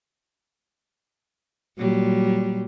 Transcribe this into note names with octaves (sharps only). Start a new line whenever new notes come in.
A#2 F#3 G3